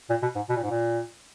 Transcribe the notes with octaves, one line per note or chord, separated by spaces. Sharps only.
A#2
B2
G#2
B2
A#2
G#2
A#2